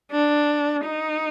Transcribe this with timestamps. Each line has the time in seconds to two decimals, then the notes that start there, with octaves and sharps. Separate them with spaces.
0.11 D4
0.84 D#4